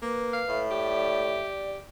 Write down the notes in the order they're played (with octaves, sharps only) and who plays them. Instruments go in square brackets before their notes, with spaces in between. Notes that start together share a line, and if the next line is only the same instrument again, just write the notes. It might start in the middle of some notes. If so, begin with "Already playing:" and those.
[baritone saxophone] A#3 [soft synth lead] B4
[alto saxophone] F5
[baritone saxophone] A2 [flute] E5
[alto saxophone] G4 [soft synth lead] D5